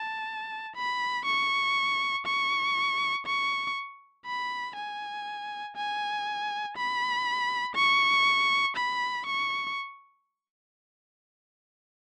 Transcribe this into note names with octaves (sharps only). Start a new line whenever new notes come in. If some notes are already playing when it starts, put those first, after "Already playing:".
Already playing: A5
B5
C#6
C#6
C#6
B5
G#5
G#5
B5
C#6
B5
C#6